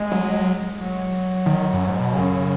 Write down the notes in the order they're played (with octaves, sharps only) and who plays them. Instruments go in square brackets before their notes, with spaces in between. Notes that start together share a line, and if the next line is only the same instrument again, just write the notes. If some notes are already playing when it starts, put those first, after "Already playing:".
Already playing: [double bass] G#3
[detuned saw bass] F#3
[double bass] F#3
[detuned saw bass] D#3
F#2
G#2
B2
[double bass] F#2 [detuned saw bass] C#3